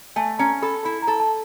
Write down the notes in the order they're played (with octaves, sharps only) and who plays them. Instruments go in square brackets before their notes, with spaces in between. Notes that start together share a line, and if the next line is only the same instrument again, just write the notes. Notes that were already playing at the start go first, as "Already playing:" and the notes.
[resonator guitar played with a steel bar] A3 [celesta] G#5
[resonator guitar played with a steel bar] C#4 [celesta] A#5
[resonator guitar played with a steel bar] A4 [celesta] B5
[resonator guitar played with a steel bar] E4 [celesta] B5
[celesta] A#5
[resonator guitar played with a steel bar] A4
[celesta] A5